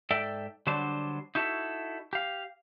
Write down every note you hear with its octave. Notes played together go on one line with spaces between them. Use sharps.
G#2 A4 D5 E5 G5
D3 F#3 G3 D4 C5
D#4 E4 F#4 A4
G4 F5